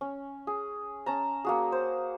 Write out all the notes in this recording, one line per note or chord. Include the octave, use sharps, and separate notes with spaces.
C#4
G#4
C#4 A5 A#5
A#3 F#4 G#4
C5